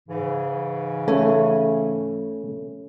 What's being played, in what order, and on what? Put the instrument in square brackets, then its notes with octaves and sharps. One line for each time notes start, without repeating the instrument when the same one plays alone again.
[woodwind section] G#2 C#3 E3
[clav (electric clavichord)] A3 [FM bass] C#4